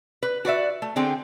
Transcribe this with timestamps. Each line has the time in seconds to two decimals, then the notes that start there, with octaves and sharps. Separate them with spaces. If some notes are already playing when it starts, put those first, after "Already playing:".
0.23 B4
0.45 F#4 B4 D5 E5
0.82 A3
0.96 D3 C4 G#4 G5